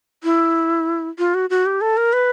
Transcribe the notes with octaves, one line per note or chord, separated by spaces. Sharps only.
E4
F4
F#4
F#4
G4
A4
A#4
B4